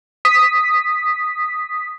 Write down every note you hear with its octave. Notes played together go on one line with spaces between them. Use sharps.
D#6 B6